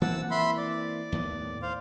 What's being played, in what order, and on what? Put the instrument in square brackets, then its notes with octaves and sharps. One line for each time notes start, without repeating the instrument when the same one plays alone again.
[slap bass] E3 A#3 C4 [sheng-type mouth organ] F#5 A5 E6
[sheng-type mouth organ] E5 B5 C6
D5
[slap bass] D#2 A2 B3
[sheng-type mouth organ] C5 F5